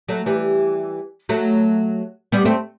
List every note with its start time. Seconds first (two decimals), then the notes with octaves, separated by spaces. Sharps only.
0.09 F#3 A3
0.26 E3 G3
1.29 F#3 A3
2.32 G3 B3
2.45 A3 C4